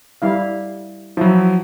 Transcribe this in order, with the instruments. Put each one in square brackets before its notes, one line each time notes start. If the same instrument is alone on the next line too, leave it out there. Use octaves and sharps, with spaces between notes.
[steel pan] G3 E4 F5
[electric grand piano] F3 F#3 [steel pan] E4